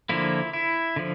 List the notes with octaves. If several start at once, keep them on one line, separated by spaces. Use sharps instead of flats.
D3 F3 A#3 E4
E4
D3 F3